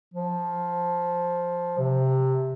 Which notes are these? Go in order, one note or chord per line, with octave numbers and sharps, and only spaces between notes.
F3
C3